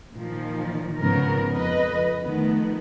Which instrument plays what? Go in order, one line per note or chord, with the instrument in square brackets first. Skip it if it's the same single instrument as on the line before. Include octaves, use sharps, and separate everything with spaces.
[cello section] A#2 D#3 F3
G#2 C#3 F3 B3 A#4
F2 B4 D#5
D#3 F3 A3 B3